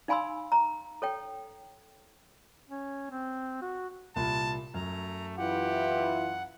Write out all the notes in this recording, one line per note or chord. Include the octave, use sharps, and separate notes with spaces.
D#4 F5 G#5 B5 C6 E6
A#5
A4 C#5 G5
C#4
C4
F#4
C2 A#2 A5
F#2 A3 A#5
E3 E4 F4 G4 F#5